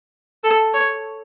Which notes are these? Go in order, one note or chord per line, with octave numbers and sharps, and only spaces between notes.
A4
C#5